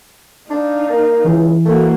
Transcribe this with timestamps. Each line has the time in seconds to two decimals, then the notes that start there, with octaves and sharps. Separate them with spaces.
0.50 D4 D#4 F5
0.90 A#3
1.24 C#2 E3
1.65 A3 A#3 F#4